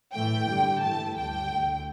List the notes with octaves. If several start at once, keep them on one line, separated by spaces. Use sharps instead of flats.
A2 E3 A3 G5
G2 D3 G3
G2 E3 A3 A5
D2 D3 G3 G5
D2 D3 A3